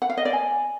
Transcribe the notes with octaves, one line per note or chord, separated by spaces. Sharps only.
F#5
F5
D#5
D5
G#5